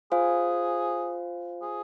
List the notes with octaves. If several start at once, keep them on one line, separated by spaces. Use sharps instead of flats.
F4 G#4 C5 F5 G#5
G#4